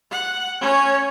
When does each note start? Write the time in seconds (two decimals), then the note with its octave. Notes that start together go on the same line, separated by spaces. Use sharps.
0.11 F#5
0.60 C#4 C#5